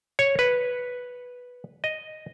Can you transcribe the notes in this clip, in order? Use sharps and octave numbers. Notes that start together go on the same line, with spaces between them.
C#5
B4
D#5